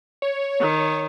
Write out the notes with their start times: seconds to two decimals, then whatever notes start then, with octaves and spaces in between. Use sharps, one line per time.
0.22 C#5
0.61 D#3